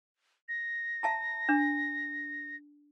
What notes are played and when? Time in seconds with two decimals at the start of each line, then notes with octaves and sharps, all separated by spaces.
0.49 A#6
1.03 E5 A5 A#5
1.49 D4